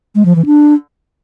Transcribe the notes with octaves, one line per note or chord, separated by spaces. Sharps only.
G#3
F3
E3
D4